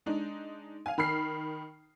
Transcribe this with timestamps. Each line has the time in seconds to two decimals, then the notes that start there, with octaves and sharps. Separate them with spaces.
0.06 G#3 D4 D#4
0.86 F5 G#5
0.98 D#3 B5 F6 C7